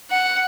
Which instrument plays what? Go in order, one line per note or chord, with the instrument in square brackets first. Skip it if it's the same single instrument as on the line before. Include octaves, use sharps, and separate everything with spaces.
[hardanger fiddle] F#5